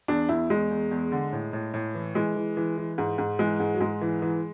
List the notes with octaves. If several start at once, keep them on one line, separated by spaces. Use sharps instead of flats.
E2 D4
E2 E4
E2 G#3
E2
E2
D3
A2
A2
A2
E3
E3 G#3
E3
E3
E3
G#2
G#2
E3 G#3
G#2
F#3
G#2 G#3
E3
E3